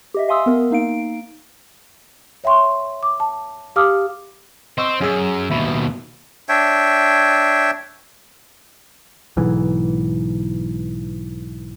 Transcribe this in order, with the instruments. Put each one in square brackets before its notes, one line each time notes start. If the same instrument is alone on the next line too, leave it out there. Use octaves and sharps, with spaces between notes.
[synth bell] G4 D#5 E5
E5 F5 G#5 C6 D#6 E6
B3 A#4
A#3 D#4 F5 D7
[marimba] C#5 E5 G5 C6 C#6
D6
A5
G4 F5 A5 D6 D#6 F6
[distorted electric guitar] C4 [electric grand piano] D#5 C#6 E6
[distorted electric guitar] F#2 [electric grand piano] C#4 G#4 E6
[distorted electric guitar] D#2 B2 [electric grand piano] E5 B5
[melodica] D4 C#5 E5 G5
[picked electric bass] B1 G#2 E3